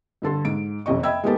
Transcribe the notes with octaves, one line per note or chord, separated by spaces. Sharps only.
G2 D3 A4 C6
G#2 D7
F#1 F2 C3 D#5 C#6
D#5 E5 G5 B5 E6 G#6
G#3 A#3 B3 D#4 G4 A4